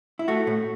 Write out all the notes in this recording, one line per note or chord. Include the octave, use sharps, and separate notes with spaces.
E4
A3 F#4
A2